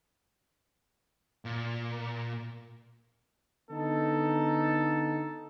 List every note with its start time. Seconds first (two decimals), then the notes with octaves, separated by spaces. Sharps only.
1.45 A#2
3.70 D3 B3 D#4 A4